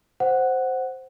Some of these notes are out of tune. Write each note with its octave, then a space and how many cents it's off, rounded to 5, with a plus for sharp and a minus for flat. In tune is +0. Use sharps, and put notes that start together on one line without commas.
C5 +0 F#5 +0